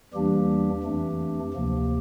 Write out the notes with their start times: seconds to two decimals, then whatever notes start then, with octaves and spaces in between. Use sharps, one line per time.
0.14 E2 E3 G3 A#3 D4 G4
0.83 F2 E3 A3 D4
1.54 D2 C3 F3 A#3